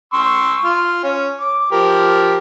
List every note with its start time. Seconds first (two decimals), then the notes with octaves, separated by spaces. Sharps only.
0.13 C6 C#6 E6
0.65 F4
1.04 C#4
1.40 D6
1.72 F3 G4 A#4